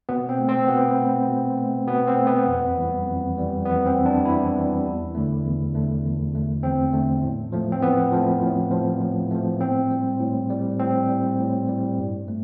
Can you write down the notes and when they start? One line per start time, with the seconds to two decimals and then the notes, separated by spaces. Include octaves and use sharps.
0.09 B2 B3
0.29 C4
0.39 A3
0.49 C4
0.68 B2 B3
0.98 A3
1.28 B2
1.57 A3
1.87 B2 B3
2.07 C4
2.17 A3
2.27 B3
2.46 F2
2.77 E3 G3
3.06 F2
3.36 E3 G3
3.66 F2 B3
3.86 C4
3.95 E3 G3
4.06 D4
4.25 F2 E4
4.55 E3 G3
4.85 E2
5.15 D3 A3
5.44 E2
5.74 D3 A3
6.04 E2
6.34 D3 A3
6.63 E2 C4
6.93 D3 A3
7.23 A2
7.52 F3 A3
7.72 C4
7.82 A2 B3
8.12 F3 A3
8.42 A2
8.71 F3 A3
9.01 A2
9.31 F3 A3
9.61 A2 C4
9.91 G3
10.20 A2
10.50 G3
10.79 A2 C4
11.09 G3
11.39 A2
11.69 G3
11.98 G2
12.28 A3